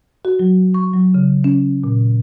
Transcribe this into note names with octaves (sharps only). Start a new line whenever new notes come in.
F#4
F#3
C#6
F#3
C#3
C#4
A#2